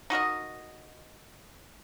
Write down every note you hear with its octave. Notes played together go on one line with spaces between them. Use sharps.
D#4 F#4 A#4 D#5